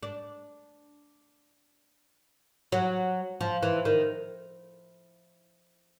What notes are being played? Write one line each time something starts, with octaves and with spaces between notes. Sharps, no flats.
D4
F#3
F3
E3
D#3